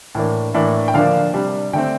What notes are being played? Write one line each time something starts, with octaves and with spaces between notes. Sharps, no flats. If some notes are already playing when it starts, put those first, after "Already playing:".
A2 E3 A#3 D4
A2 E3 A#3 D4
G5
D3 F3 A#3 D4 F5
C3 G3 D4
D3 A3 C4 G5